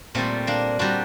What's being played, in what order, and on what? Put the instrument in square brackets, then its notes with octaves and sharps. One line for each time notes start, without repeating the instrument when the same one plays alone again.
[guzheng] A#2 G3 A3 C4
A#3 D4
A#2 G3 D4 F#4